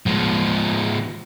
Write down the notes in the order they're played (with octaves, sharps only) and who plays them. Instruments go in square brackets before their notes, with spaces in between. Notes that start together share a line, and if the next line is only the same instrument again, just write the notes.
[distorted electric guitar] F3 G#3